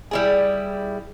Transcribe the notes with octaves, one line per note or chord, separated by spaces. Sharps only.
G3 E4 G#4